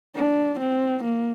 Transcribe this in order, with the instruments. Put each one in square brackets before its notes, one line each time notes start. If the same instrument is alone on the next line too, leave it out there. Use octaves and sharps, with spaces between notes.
[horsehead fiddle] D4
C4
A#3